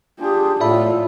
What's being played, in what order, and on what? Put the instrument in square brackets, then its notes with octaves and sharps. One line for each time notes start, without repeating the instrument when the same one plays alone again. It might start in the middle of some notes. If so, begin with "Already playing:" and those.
[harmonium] D4 F4 G#4 [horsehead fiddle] G4
[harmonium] A2 A4 [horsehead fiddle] F4 [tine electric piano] D5 E5 B5